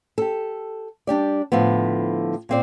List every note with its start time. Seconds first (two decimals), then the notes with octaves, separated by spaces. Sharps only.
0.18 G4 A4
1.07 G3 D4 G4 D5
1.52 A2 D3 F3 B3
2.49 A#2 C4 D5